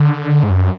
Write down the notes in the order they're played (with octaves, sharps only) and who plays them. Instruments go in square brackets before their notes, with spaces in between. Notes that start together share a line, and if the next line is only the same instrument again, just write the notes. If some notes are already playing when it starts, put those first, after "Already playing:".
Already playing: [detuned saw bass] D3
G#2
F#2